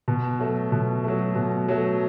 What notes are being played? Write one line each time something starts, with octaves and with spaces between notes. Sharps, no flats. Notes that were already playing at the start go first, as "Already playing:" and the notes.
B2
F#3 A3
B2
F#3 A3
B2
F#3 A3